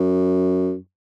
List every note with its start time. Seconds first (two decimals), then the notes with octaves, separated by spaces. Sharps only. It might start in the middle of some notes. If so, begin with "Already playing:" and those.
Already playing: F#2